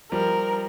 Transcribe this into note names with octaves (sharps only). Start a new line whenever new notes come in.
F3 G3 A#4